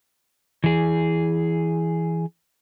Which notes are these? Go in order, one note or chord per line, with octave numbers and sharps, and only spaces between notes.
E3 G#4